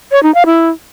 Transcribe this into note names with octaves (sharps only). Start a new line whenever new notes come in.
C#5
D#4
F5
E4